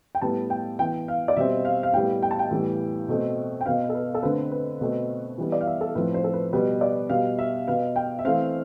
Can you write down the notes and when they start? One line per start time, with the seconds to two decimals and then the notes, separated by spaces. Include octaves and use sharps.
0.15 G5
0.21 A2 G3 B3 A5
0.50 G5
0.79 E3 B3 G5
1.08 F5
1.28 D5
1.36 B2 G3 C4 E5
1.65 F5
1.83 F5
1.94 A2 G3 B3 G5
2.23 G5
2.31 A5
2.39 G5
2.51 A2 E3 G3 B3
3.09 B2 A3 C4
3.61 G5
3.66 B2 B3 F5
3.89 A4
3.95 B4
4.15 A4
4.23 D3 A3 C4 B4
4.52 B4
4.81 B2 A3 C4
5.38 E3 G3 B3
5.52 D5
5.61 F5
5.67 E5
5.81 A4
5.95 A2 F3 C4 B4
6.14 C5
6.24 A4
6.34 B4
6.53 B2 G3 B3 B4
6.81 D5
7.10 B2 G3 B3 F5
7.39 E5
7.67 B2 B3 F5
7.96 G5
8.19 E5
8.25 E3 A3 C4 F5